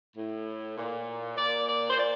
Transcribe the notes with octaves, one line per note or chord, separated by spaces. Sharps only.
A2
A#2
A#2 D5
D5
C5
A#2 D5